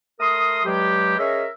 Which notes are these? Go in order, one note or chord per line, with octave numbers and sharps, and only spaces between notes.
A3 A#4 C6 D#6
G2 F#3 G#3 G4
C#4 G#4 A#4 D#5 E5